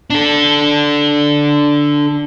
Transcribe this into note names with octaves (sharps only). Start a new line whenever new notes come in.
D4 A4